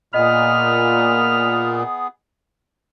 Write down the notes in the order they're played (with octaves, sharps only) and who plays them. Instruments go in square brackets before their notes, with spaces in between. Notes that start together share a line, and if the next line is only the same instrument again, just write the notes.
[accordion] A#2 [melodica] B3 G#4 [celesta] D#5 [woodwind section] B5 D#6 F6